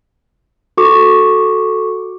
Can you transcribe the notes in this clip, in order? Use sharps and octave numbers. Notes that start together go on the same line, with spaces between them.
F#4 A4 C#6 D6